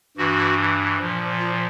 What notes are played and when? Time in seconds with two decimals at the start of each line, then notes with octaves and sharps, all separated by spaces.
0.17 G2 E3 F#4
0.99 A#2 F3
1.39 F4